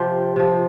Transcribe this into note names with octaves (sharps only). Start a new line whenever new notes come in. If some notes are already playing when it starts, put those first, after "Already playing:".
Already playing: C3 F3 G4 C5
C3 F3